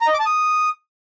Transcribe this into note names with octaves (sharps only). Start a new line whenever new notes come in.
A#5
D#5
D6
A5
D#6